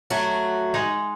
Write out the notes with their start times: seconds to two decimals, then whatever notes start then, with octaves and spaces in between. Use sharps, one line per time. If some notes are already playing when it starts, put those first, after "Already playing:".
0.10 F#3 A3 F#4
0.74 G#3 D#4 F#5